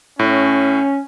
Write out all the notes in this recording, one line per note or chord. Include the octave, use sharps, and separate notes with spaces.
A2 C#4